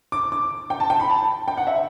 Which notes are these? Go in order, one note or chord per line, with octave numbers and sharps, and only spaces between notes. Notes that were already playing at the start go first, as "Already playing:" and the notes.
D6
D6
G5
A5
G5
B5
A5
G5
F#5
E5